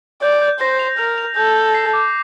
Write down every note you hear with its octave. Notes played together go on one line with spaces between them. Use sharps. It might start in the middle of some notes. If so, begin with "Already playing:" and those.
D5 G6
G6
C5 A#6
F7
A#4 F7
F7
A4 G6
G6
C7
D6